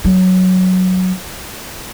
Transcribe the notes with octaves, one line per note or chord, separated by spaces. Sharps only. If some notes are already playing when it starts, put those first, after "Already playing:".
F#3